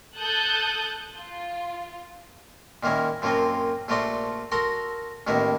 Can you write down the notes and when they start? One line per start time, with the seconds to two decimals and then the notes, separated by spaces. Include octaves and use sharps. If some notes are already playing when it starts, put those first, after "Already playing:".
0.18 A4 D#6 F#6 G6 A6
1.15 F4
2.83 A#2 D#3 A#3 C#4 E4
3.22 F#2 F3 F#3 A#3 C4 F4
3.88 A#1 A3 F4 F#4 D5 C6
4.52 F#4 A4 A#4 C6
5.27 A1 A2 D#3 A#3 B3 E4